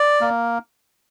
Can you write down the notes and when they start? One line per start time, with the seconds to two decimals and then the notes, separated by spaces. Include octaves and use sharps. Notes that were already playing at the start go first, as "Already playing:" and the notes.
Already playing: D5
0.21 A#3